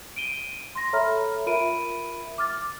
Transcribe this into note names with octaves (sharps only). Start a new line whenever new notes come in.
D7 D#7 G7
C6 A#6
A4 C#5 E5 A#5 B5 F6
F4 A#4 E5 B5 D7 D#7
D6 F6 A6